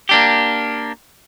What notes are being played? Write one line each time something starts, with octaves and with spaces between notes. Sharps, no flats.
A#3 D4 G4